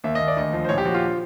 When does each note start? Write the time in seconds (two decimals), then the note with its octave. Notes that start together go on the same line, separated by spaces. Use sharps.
0.04 D#2 E5
0.15 D#2 D#5
0.28 D5
0.37 D2 D#5
0.53 F3
0.65 C5
0.69 A#1 C#5
0.78 G4
0.85 F3 F#4
0.94 F4